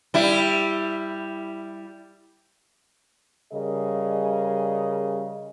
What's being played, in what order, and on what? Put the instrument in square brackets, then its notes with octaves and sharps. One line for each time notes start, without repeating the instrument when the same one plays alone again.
[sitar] G3 E4
[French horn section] C#3 G3 G#4 A#4 D#5